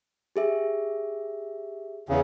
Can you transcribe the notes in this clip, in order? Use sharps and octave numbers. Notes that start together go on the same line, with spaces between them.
G4 G#4 E5
E2 C#3